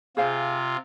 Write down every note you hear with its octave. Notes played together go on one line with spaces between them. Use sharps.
C3 F4 G#4 C5 F5